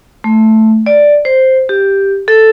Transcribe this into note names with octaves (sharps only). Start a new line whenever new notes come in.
A3
D5
C5
G4
A4